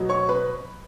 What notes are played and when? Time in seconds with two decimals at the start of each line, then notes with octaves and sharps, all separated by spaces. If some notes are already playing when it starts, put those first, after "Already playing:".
Already playing: B2 F#3
0.09 C#5 C#6
0.29 B4 B5